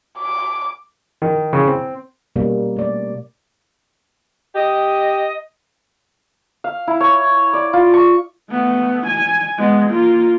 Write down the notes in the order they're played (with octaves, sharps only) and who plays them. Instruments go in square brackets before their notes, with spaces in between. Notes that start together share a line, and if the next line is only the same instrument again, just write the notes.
[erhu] D6
[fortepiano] D#3
C#3
C4
[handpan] B2 G3 A#3 C#4
A3 D5
[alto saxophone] G4 [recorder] D#5
[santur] F5
E4
C#5
D5
F4
C#6
[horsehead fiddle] A3 B3
G#5
G#3 B3
A#3 F4